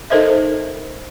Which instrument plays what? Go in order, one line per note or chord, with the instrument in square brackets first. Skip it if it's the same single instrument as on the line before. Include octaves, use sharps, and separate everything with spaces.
[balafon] D#4 A4 A#4 C5 D#5 E5